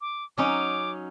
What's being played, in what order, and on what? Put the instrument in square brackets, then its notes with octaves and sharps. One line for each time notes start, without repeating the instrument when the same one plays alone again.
[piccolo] D6
[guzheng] F#3 C#4 D#4 [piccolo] D6